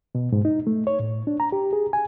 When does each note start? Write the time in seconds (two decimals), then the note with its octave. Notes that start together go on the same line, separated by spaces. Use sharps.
0.15 B2
0.32 G#2
0.45 D#4
0.67 A3
0.87 C#5
1.00 A2
1.27 D4
1.40 A#5
1.52 G4
1.73 G#4
1.93 G#5